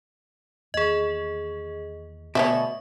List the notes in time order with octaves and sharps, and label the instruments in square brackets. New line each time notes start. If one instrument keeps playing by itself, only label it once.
[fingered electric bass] E2 D#3 A#3 [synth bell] G#4 D#5
[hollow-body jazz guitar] D2 B2 [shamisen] C#5 D5 E5 [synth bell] C#6